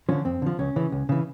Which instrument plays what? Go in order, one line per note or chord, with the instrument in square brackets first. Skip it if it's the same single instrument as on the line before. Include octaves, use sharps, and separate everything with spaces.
[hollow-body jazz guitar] D3 F3 C#4
F2 C4
D3 F3
C#2 C#4
C#3 E3
C#2
C#3 E3